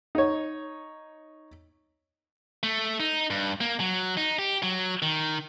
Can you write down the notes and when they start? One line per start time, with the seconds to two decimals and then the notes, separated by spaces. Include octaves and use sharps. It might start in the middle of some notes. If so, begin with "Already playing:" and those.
0.15 D#4 C#5
2.63 A3
3.00 D#4
3.30 G2
3.61 A#3
3.80 F#3
4.17 D#4
4.39 G4
4.63 F#3
5.02 D#3